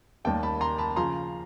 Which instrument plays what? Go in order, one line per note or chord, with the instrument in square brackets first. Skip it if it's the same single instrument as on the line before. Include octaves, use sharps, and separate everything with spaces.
[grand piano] D#2 D#3 G3 A#3 G5 A5
A5 B5
A#5 C6
A5 B5
C#3 F3 A#5 C6